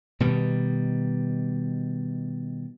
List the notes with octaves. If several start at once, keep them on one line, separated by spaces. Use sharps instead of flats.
B2 D#3 G3